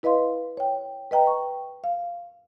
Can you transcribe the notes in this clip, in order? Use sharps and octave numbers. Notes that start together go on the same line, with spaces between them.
E4 B4 D#5 F5 C6
C#5 G5
B4 D#5 G5 A#5
C#6
F5